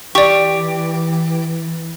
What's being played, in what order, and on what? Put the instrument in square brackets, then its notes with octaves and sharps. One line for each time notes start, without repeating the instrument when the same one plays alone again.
[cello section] E3 [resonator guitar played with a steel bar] G4 [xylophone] D5 C#6